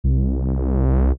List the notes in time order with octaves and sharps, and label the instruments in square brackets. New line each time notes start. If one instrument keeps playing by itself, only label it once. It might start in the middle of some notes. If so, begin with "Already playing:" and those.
[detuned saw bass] C2